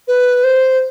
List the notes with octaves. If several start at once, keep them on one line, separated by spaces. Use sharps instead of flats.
B4
C5